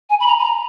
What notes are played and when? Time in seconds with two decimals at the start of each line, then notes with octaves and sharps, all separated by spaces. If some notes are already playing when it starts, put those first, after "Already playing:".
0.10 G#5
0.20 B5
0.27 A#5
0.40 B5
0.43 A#5